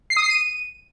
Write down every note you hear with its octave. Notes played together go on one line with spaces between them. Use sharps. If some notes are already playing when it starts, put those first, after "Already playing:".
C7
D#6
C7
D#7